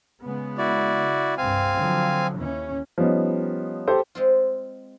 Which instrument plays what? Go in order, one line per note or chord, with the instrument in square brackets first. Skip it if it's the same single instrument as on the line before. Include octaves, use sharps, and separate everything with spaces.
[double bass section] C#3 G#3 B3
[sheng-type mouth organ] E4 F#4 D5
[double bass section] C2 G2 [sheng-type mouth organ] C4 F5 G#5
[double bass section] D3 F3 F#3
D#2 E3 C#4
[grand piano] F3 G3 B3 C#4 D#4
G4 A4 C5
[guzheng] G#3 C4 F4